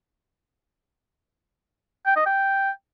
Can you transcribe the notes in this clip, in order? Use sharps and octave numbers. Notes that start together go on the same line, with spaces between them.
G5
D#5
G5